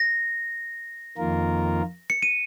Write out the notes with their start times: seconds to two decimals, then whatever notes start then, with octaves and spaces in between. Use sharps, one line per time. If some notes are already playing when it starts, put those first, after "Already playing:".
Already playing: A#6
1.17 F2 D#3 A#3 F4 A#4
2.10 C#7
2.22 D#7